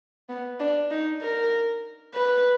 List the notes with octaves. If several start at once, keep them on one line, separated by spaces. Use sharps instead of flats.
B3
D4
D#4
A#4
B4